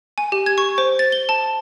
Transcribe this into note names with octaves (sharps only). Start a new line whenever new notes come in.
G#5
G4
G#6
C#6
C5
A6
G7
A5